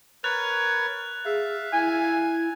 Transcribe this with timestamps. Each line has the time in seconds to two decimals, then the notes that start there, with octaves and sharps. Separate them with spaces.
0.24 A#4 B4 C#5 F#6 A6 F7
1.25 G#4 E5 F5
1.73 E4 G#5